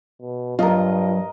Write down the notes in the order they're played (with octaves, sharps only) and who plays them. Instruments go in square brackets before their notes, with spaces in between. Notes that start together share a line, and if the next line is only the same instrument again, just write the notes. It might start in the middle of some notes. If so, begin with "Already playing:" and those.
[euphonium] B2
[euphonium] G2 [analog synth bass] F#3 [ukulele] F4 [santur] A#4 D#5